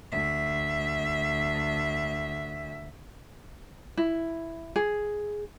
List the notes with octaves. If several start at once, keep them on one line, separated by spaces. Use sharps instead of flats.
D2 E5
E4
G#4